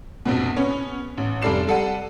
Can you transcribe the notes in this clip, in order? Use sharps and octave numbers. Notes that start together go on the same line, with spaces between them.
A#1 F2 B2
B3 C#4 C#5
A1
F1 G3 A4 D5 C7 E7
G3 A4 F#5 D#7